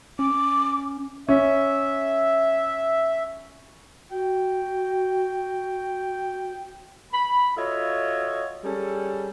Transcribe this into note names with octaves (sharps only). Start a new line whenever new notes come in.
C#4 D6
C#4 E5
F#4 G5
B5
F4 F#4 A4 C#5 D#5 E5
G3 C#4 G#4 A4